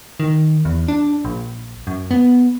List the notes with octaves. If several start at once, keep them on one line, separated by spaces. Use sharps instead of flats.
D#3
E2
D4
A#1
F#2
B3